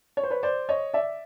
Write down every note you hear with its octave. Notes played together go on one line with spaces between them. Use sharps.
C#5
C5
B4 C#5
C5 D5
C#5 D#5
D5 E5